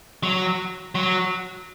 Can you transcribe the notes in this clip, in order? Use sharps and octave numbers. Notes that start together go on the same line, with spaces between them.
F#3
F#3